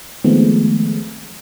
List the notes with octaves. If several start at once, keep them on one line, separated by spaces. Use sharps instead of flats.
D#3 F3 G#3 A3 B3 C4